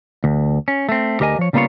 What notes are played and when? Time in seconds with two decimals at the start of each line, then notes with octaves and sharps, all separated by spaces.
0.24 D2
0.68 C#4
0.89 A3 C4
1.20 D2 G4 A#4 D#5 G#5
1.39 F3 C#5
1.53 C#3 G3 A#3 B3 F4 C#5